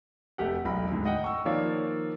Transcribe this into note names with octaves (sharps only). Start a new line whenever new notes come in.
F1 A3 G4 F#5
E1 B1 A#5 B5
D2 G#2
D#5 F#5 G5
C#6 E6
D#3 F3 A#3 F4 C#5 D5